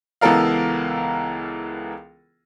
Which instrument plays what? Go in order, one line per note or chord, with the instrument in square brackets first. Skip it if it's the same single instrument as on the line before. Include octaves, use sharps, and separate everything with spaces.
[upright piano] C#2 E3 B3 A4 A#4 F5